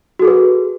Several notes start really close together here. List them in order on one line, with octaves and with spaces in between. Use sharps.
F#4 A4 G#4 B4